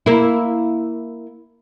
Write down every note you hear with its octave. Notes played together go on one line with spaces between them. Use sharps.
A#3 E4